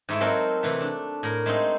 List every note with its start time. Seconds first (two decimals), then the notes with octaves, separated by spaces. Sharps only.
0.09 G#2 A3 E4
0.21 F#3 C4 D#4 A4 A#4
0.63 C3 E3 A3
0.81 D4
1.23 A2 A#4
1.46 G#3 A3 C4 D#4